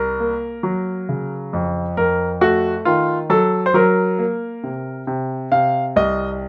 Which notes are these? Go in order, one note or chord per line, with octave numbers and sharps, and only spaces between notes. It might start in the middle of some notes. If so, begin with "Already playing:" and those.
Already playing: C2 A#4
A#3
F#3
C#3
F2
F2 A#4
A3 F#4
D#3 F4
F#3 A4
C5
F#3 A#4
A#3
C3
C3
C3 F5
C2 D#5